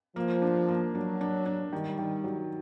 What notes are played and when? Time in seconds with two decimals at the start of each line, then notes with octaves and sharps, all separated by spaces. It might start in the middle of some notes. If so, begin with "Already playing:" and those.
0.16 F3 A#3
0.42 D4
0.69 A#3
0.95 F#3 D4
1.21 D4
1.46 D4
1.72 D#3 G3
1.99 D#3
2.24 F#3